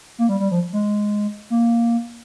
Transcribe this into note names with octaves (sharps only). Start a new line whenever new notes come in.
A#3
G3
G3
F3
G#3
A#3